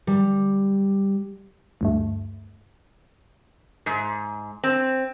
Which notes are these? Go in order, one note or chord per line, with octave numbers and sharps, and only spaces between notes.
G3
D2 G2 A3
G#2
C4